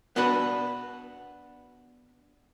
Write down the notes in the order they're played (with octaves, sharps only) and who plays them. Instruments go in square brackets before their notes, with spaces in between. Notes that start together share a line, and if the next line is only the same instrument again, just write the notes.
[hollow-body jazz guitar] B3 D4 F#4 B4